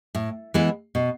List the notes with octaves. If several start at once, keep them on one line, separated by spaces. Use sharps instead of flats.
A2
E3 G#3 B3 E4
B2